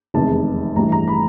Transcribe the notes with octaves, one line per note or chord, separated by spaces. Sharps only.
F1 E2 C3 D#3 G#3 A5
A1 G2 E3 A#5
A#5
B5